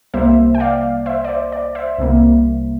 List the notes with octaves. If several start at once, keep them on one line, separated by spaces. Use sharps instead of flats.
C2 C3 G3 A#3 C5 E5
G5
D5 F5
C5 E5
D5
C5
D5
C5 E5
C2 C3 G3 A#3